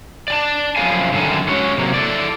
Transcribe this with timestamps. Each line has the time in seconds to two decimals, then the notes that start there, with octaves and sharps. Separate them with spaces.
0.28 D5 G#5 A5
0.76 F#2 F3 G3 A#4 F5 G#5
1.13 F#2 D3 D#3 A4 G#5
1.48 G#3 C#4 F#4 C#5
1.78 C3 F#3 A#3
1.94 E4 A4 D5